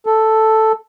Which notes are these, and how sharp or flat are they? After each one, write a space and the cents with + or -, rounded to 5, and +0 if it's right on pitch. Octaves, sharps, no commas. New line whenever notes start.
A4 +0